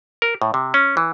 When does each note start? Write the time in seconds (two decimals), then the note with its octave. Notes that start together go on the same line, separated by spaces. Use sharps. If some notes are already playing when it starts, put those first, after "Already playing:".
0.22 A#4
0.42 A2
0.54 C3
0.74 C#4
0.97 E3